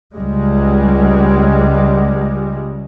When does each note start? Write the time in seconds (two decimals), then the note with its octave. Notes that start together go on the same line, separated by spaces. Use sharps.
0.15 C#2 G3 G#3